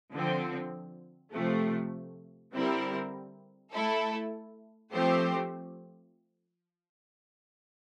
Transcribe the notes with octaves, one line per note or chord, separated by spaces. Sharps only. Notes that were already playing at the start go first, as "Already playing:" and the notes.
D3 F3 C4
C3 F3 A3
D3 G3 C4 E4 A#4
A3 E4 A4
F3 A3 C4 G4 C5